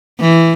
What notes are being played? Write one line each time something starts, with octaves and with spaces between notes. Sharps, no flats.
E3